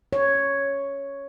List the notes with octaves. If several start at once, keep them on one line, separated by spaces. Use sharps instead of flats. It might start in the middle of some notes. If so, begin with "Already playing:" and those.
C#5